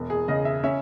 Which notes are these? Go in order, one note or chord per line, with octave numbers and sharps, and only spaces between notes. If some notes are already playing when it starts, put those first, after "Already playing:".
Already playing: E1
G#4
C#3 D#5
E5
C#4 E5